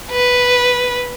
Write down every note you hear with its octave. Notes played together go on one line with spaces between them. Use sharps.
B4